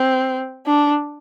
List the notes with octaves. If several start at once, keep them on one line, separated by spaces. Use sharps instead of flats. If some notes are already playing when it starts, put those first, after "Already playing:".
Already playing: C4
D4